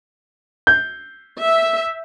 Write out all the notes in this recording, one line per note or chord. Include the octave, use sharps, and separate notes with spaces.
G6
E5